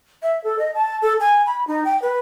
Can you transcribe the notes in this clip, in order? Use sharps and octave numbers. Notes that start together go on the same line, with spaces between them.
E5
A4
D#5
A5
A4
G#5
B5
D#4
G5
B4